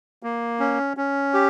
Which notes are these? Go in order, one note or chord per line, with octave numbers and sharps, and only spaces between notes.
A#3
C#4
C#4
G4